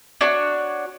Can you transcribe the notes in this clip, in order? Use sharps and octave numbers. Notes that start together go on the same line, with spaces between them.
D4 F#4 C#5